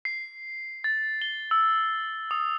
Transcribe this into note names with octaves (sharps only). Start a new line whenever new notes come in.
C7
A6
G7
E6
D#6